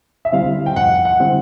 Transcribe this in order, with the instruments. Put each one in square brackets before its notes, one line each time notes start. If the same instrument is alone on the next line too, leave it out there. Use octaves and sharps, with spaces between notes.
[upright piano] E5
[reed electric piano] D3 G3 C4 E4 [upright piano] F5
[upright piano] G5
[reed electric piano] F2 [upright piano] F#5
[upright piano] F#5
[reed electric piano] D3 G3 C4 E4